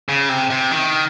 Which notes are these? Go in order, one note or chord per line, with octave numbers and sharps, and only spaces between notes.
C#3
C3
C3
D#3